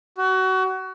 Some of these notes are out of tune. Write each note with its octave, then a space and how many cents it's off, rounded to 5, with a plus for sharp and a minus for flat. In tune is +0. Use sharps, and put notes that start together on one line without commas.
F#4 +25